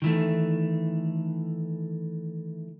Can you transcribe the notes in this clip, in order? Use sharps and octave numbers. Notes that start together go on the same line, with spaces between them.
D#3 E3 A3